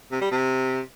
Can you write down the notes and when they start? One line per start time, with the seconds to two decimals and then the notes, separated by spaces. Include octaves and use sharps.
0.12 C3
0.21 G3
0.31 C3